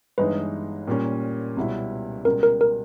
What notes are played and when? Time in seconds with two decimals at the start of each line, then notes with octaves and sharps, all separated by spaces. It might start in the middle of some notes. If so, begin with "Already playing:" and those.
0.18 G1 G2 E3 G#3 D#4 B4
0.88 A#2 G3 A#3 C#4
1.57 C#2 B2 G3 C#4 E4
2.25 C#2 B2 G3 A#4
2.43 A#4
2.61 A#4